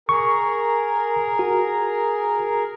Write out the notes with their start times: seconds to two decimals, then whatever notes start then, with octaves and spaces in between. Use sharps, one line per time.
0.09 G#4 A#4 C#6
1.39 F#4